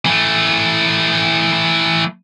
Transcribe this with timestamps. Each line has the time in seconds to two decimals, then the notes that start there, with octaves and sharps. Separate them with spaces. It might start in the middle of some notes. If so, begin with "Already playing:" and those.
0.06 E3 A3